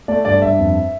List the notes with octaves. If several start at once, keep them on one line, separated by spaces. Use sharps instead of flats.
A3 D5
G2 D5
G2 E5
F2